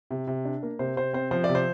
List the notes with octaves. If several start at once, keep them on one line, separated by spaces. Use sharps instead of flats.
C3
C3
D4
A#3
C3 C5
C3 C5
C4 C5
F3 C5
D5
C3
C5